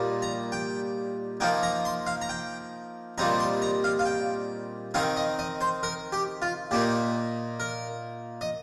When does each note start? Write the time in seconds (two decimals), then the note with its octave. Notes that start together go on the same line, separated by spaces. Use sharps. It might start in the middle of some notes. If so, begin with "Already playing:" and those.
Already playing: A#2 G3 D#4
0.22 A#5
0.52 G5
1.40 F3 A#3 D#4 G5
1.63 A#5
1.85 C6
2.07 F5
2.22 A#5
2.29 G5
3.18 A#2 G3 C4 D#4 A#5
3.40 C6
3.62 A#5
3.84 F5
3.99 F5
4.06 G5
4.94 D#3 C4 D#4 F5
5.16 D#5
5.39 D#5
5.61 C5
5.83 A#4
6.12 G4
6.42 F4
6.71 A#2 A#3 D#4 G4
7.60 A#4
8.41 D#5